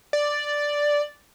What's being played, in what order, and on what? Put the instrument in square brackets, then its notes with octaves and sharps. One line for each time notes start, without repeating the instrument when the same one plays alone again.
[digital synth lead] D5